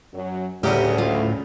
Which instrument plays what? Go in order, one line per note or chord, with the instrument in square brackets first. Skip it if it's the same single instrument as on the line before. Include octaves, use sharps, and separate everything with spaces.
[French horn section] F#2 F#3
[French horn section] D2 [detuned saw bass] A2 [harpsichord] C#3 F#3 G3 [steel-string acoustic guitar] G4 F#5 G#5
[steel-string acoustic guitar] F4